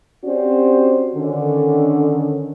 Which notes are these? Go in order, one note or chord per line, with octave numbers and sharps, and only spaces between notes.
C4 C#4 F#4 G4 C5 D5
D3 D#3 C#4